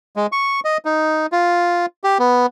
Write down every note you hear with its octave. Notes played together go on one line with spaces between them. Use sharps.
G#3
C#6
D#5
D#4
F4
G4
B3